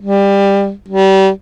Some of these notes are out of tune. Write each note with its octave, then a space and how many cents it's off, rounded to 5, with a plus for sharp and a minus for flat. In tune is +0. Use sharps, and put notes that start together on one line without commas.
G3 +20
G3 -30